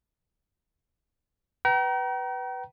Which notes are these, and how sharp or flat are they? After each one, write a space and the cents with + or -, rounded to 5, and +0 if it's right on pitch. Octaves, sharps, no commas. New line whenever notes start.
B4 +0 G5 -40 A#5 +25